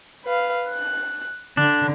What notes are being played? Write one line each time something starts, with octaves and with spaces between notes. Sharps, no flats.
B4 F5
F#6
D3 D4